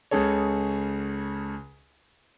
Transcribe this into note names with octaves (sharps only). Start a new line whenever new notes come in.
C#2 C#3 G#4 A4 C#5